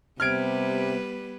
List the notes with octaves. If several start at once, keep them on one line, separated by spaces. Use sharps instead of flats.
C3 G3 B3 B4 F6 G#6 D7